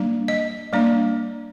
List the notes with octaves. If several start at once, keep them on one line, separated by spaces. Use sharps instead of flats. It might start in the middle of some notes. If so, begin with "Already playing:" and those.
Already playing: G3 A#3 D4
D#5
G3 A#3 D4 D5